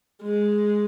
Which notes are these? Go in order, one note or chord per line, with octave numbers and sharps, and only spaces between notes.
G#3